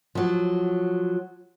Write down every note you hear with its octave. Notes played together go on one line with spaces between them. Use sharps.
F3 F#3